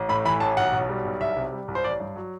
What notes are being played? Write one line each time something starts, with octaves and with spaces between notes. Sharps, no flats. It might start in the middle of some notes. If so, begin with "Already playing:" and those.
Already playing: A1
A2 B5
E3 B5
A1 A5
B1 F#5
B2
G3
B1
C2 E5
C3
G3
C2
C5
A1 D5
G2
F#3